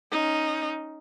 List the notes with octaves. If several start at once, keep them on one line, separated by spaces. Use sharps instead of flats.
C#4 D#4